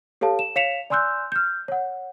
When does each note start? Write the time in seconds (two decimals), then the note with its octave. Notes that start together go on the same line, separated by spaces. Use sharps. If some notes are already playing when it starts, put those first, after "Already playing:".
0.21 G4 A4 C#5 F5 A5
0.39 E7
0.56 C#5 F5 B6 C#7 E7 F7
0.90 D5 G#5 C6 E6 F#6 G6
1.32 F6 G6
1.68 C#5 F#5